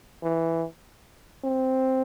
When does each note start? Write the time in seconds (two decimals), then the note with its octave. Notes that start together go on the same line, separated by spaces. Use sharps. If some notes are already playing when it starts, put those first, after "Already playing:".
0.23 E3
1.44 C4